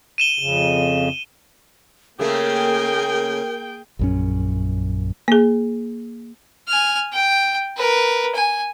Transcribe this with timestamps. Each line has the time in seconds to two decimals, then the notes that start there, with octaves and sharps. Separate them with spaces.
0.18 D#7 E7 G7
0.39 F2 C#3
2.19 C#3 A3 A#3 G#4 A#4 G5
3.99 A#1 F#2 C#4
5.28 A#3 G#4
6.68 G#5 F6
7.12 G5
7.77 A#4 B4
8.35 G#5